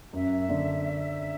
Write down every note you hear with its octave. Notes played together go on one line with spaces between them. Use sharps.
F#2 E5
D3